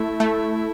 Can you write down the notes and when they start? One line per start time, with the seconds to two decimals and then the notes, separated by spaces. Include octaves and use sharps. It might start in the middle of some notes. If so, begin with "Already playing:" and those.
Already playing: A3 E4
0.20 A3